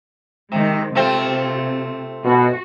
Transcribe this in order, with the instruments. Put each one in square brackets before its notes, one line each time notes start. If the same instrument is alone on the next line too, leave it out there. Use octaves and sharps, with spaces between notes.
[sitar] C3 [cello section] D#3 G#3
[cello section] C3 [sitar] A3 C4 F4
[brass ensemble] B2 [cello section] F#4